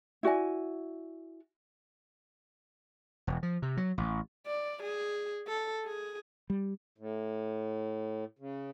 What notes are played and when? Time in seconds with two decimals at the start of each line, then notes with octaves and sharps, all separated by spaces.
0.23 E4 F#4 D5 G#5
3.27 E1
3.43 F3
3.62 C3
3.77 F#3
3.98 A1
4.46 D5
4.83 G#4
5.47 A4
5.85 G#4
6.50 G3
6.98 A2
8.39 C#3